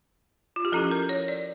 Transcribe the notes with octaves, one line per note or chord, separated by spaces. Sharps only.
F4
G4
F3 C#4 E4 A4
A#4
C#5
D5